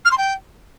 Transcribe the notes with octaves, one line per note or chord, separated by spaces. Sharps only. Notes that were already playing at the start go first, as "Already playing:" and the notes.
F6
C6
G5